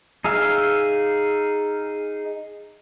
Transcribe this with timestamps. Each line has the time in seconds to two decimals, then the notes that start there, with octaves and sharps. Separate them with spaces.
0.24 D#4 G#4 E5 F5